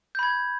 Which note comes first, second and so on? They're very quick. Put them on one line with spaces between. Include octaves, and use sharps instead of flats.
G6 B5 G#6